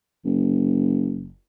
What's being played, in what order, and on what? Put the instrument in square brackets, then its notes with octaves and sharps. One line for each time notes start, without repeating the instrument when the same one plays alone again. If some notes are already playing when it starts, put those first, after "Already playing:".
[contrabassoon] F#1